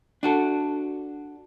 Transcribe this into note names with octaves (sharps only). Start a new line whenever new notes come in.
D4 F#4 A4